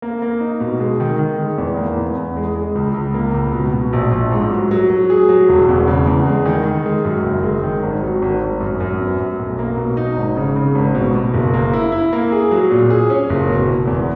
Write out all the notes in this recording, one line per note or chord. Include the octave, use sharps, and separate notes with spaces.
A#3
A#3
D#4
B2
G#3
D#3
D#3
G#3
E2
A#3
E2
E2
G#3
G#3
C#2
C#2
A#3
C#2
B2
B2
A#1
A#1
G#2
F#3
F#3
F#3
G#4
F#3
E1
E2
C#3
E2
G#3
D#3
D#3
G#3
F#2
F#1
G#3
D#3
G#1
F#3
G#1
G#1
F#2
F#2
B3
F#2
B1
A#3
B2
D#4
G#1
C#3
C#3
G#1
B2
B2
F#1
A#3
E4
E4
A#3
G#4
F#3
A#2
G#4
C#4
F#1
B2
F#1
E2